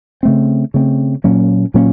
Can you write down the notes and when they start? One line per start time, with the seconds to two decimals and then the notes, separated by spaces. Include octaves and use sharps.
0.23 C#3 A3 C4
0.74 C#3 A3 C4
1.24 A#2 F#3 A#3 C#4
1.74 A#2 F#3 A#3 C#4